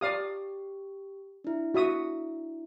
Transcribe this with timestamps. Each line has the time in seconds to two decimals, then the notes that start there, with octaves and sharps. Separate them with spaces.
0.01 G4 D5 F5 D#6
1.44 D4 E4
1.74 F#4 E5 D#6